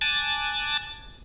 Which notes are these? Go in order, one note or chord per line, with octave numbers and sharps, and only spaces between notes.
G#5 A5 D6 F#6 A6